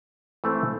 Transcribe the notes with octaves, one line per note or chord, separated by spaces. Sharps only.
E3 A3 C4